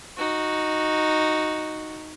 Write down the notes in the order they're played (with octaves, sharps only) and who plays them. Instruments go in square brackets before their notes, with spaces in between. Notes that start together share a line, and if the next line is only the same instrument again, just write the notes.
[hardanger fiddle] D#4 F#4